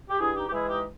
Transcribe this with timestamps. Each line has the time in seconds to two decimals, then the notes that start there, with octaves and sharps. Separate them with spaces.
0.09 G4
0.19 G2 E4 G#4
0.36 D#4 G4
0.48 G4
0.52 E3 G#3 E4 G#4
0.68 D#4 G4